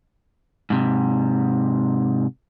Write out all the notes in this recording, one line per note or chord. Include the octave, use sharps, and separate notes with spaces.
G#2 C3